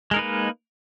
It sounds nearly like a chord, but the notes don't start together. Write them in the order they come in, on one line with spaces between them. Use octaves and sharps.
G#3 A#4 D#4 B4 A#3